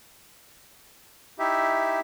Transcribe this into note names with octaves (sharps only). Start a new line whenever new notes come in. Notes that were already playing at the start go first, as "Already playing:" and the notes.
D#4 E4 G4 E5